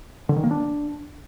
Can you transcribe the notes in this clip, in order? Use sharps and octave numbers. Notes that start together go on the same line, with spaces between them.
D3
D#3
A#3
D4